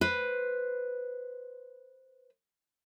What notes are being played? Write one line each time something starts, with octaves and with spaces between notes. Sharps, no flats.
B4 C5